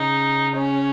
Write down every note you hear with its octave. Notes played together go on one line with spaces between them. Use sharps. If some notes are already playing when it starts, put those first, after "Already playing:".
Already playing: C#3 D#4
C#4